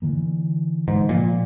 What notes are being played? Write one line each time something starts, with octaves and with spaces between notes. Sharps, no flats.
D3 E3 A#3
G#2
A#2 F3